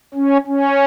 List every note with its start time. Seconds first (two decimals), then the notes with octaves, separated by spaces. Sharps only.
0.14 C#4
0.46 C#4